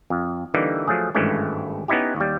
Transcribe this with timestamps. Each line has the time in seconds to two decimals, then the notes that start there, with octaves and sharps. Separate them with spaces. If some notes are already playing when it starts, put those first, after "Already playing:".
0.10 F2
0.54 D3 E3 G3 A#3 D#4
0.87 F3 F#3 A3 G#4
1.15 G#1 G2 E3 G#3 A3 C#4
1.88 B3 C#4 D#4 E4 G4
2.16 D#2 G3